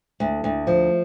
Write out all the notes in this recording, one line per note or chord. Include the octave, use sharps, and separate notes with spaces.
D2
D2
F3